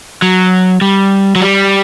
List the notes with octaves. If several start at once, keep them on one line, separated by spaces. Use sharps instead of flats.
F#3
G3
F#3
G3